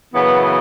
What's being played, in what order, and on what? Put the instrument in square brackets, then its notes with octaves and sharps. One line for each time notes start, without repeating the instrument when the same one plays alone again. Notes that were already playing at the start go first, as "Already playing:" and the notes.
[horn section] F#2 C#3 E3 B3